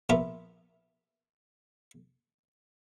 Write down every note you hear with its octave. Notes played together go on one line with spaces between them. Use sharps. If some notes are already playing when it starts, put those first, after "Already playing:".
A#1 B3 F4 A#4 E5 D6